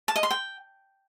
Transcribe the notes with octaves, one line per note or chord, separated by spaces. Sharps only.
A5
D#5
C6
G5